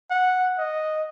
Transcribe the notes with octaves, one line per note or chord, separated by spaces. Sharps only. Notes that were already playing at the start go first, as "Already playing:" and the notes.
F#5
D#5